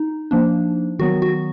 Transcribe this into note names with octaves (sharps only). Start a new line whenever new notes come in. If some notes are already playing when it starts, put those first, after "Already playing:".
Already playing: D#4
F3 A#3 D4
D#3 F#3 B3 F#4
F#4